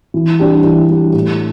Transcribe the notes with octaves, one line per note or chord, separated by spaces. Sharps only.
E3
G3 D4 G4
E3
G3 D4 G4
A2